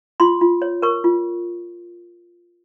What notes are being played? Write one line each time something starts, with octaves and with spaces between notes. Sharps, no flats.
F4 C6
F4
C#5
A#4 C#6
F4